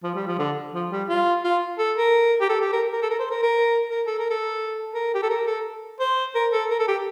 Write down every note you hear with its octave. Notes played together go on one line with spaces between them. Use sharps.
F3
G3
F3
D3
F3
G3
F4
F4
A4
A#4
G4
A4
G4
A#4
A#4
A4
A#4
C5
A#4
A#4
A#4
A4
A#4
A4
A#4
G4
A4
A#4
A4
C5
A#4
A4
A#4
A4
G4